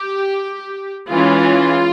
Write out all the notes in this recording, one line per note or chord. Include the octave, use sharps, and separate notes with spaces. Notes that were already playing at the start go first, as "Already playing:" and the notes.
Already playing: G4
E3 G#3 C#4 F4